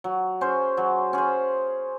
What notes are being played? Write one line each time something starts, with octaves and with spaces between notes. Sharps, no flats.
F#3
C#4 G#4 C5
F#3
C#4 G#4 C5